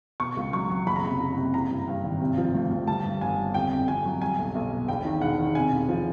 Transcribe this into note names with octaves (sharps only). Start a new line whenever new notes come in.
B2 C#6
C#2
F#3 C#6
F#3
F#1 B5
A#5
C3 B5
F#1
C3
E3 A#5
G2
G2
G#1
C3
F3
D2
D2
G3 A5
G2
G1 G#5
G3
F2 G5
F2
F2 G#5
F#3
G3 G#5
B1
B1
B2
E1 G5
D#3
E1 F#5
D#3
C3 G#5
E1
F3